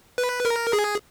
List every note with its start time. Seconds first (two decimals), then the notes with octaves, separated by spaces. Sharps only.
0.18 B4
0.45 A#4
0.73 G#4